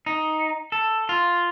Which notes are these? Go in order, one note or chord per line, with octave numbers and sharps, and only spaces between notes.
D#4
A4
F4